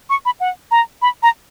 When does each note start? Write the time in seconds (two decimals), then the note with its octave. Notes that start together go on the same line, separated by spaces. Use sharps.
0.10 C#6
0.25 B5
0.40 F#5
0.71 A#5
1.02 B5
1.23 A#5